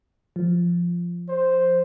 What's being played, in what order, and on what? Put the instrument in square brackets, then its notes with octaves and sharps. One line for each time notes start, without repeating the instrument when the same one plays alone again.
[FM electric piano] F3
[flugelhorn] C5